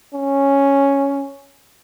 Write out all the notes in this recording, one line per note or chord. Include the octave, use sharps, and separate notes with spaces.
C#4